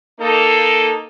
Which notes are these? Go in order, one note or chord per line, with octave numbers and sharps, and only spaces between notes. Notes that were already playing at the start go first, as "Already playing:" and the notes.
A#3 D#4 A4